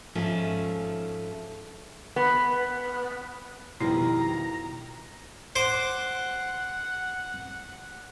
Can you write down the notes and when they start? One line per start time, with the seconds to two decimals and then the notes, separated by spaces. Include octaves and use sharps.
0.15 G#2 F3 A3 C#4
2.16 B3
3.81 F2 B2 D#3 G3 E4 A#5
5.56 C5 F#5 D6